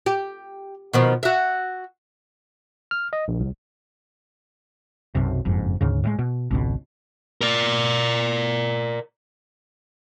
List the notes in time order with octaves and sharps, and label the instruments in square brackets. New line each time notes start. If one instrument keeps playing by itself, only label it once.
[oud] G4
B2 D#3 F3
F#4 E5
[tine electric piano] F6
D#5
A#1
C2
[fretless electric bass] B1 F#2 C3
F#1 F2 G#2
D2 G#2 C#3
A2 F#3 G#3
B2
G#1 C#2 B2
[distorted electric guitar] A#4 D5